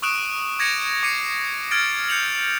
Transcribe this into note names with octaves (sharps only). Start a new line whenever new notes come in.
C#6 D#6 E6 F#6 D7 E7
D6 G#6 A#6 C#7 D#7 F7
D6 C7 C#7 D#7
F6 G#6 A6 D7
G6 C#7 F7 F#7